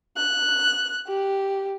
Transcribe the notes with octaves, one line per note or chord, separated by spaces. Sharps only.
F#6
G4